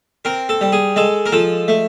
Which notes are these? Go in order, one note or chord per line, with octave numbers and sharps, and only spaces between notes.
C4 A#4
A4
G3
G#4
G#3 A4
A#4
F3 A4
A3